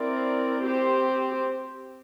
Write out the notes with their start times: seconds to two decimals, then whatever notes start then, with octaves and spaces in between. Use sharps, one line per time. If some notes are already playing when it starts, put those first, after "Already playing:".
Already playing: C4 E4 A#4 D5
0.63 C4 G4 C5